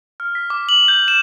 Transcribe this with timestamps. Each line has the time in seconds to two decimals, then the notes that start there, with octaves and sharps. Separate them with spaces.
0.20 F6
0.35 B6
0.50 D6
0.69 F#7
0.88 G6
1.08 E7